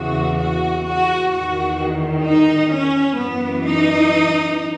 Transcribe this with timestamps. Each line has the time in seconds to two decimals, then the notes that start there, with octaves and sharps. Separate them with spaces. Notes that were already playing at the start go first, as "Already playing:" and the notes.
Already playing: E2 C#3 E3 F#4
0.38 F#4
0.85 F#4
1.31 E2 D#3 F#4
2.25 D#4
2.72 C#4
3.18 F#2 E3 B3
3.65 D#4